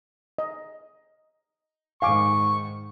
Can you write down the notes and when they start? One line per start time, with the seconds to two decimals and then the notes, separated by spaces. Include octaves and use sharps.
0.38 D#5
2.02 G#2 D#3 F5 G#5 C#6 D6